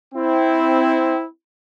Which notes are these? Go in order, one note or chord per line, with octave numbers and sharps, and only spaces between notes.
C4 E4